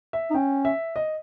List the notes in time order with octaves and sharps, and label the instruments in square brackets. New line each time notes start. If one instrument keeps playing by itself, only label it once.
[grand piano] E5
[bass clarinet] D#4
[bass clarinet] C#4 [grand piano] G5
[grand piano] E5
D#5